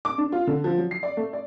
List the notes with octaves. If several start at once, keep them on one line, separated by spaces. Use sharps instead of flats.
D6
D4
F4
D3
F3
F#3
C7
D5
A3
D5